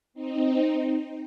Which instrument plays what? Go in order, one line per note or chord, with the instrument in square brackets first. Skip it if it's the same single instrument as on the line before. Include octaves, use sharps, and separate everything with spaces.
[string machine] C4 D#4